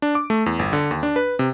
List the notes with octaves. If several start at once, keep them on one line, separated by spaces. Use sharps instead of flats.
D4
D6
A3
E2
G1
D3
D#2
D4
B4
C3